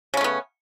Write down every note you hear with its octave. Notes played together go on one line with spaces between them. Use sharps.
C#3 A3 B3 C#4